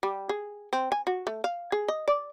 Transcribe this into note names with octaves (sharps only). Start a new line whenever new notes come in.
G3
G#4
C4
G#5
F#4
A3
F5
G#4
D#5
D5